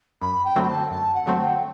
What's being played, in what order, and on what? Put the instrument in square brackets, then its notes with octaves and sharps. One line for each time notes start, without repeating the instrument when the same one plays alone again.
[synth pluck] F#2 [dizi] B5
[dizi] G5
[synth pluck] D3 F#3 A3 C4
[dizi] G5
A5
[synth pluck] F#2 [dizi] A5
[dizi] F#5
[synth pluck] D3 F#3 A3 C4
[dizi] G5